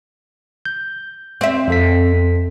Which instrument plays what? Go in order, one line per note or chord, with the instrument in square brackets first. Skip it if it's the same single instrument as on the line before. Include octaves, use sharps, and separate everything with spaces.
[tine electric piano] G6
[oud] C4 E5
[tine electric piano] F2 A4 B6